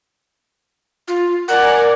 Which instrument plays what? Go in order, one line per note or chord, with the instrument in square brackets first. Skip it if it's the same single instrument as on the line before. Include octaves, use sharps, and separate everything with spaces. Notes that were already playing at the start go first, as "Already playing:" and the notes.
[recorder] F4
[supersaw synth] A#4 D5 G#5 [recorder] F#5